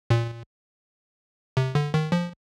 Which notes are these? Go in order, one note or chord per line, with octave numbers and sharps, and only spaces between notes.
A#2
C3
D3
D#3
F3